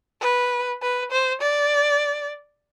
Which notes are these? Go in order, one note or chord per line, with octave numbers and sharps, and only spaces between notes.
B4
B4
C5
D5